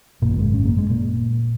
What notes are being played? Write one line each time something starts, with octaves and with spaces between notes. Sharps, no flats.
G#1 F#2 A#2 C#3 A#3
A#3
G#2 G#3
C#4
A#3
G#3
A#2 A#3